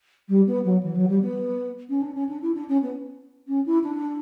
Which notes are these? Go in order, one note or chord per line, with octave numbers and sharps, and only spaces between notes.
G3
B3
F#3
E3
F#3
G3
B3
C#4
D4
C#4
D4
E4
D4
C#4
B3
C#4
E4
D4